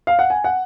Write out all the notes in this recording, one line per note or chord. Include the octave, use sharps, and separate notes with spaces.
F5
F#5
G#5
F#5